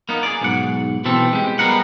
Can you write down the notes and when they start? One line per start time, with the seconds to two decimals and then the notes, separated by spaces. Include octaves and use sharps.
0.09 A#3 B3 D#4
0.23 G#4 D5
0.41 B1 G#2 F#5
1.05 B2 E3 C4 A4
1.33 G#3 G4
1.59 G3 G#3 B3 A#4 F#5